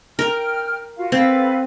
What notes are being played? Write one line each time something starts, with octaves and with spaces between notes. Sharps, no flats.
A#4 G5 F6
F4 F#4 F5
C4 A4 B4 F5